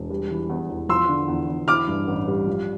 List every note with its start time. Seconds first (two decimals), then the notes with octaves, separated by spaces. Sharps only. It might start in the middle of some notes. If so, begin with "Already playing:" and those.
Already playing: E1
0.10 G3
0.30 E3
0.50 E2
0.70 E2
0.89 F3 C6 E6
1.09 D3
1.28 E2
1.48 E2
1.68 E3 D6 F6
1.87 G2
2.08 A1
2.28 G3
2.47 F3